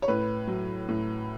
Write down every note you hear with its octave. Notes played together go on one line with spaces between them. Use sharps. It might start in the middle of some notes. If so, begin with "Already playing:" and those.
C#5
A2 B4
F#3
A2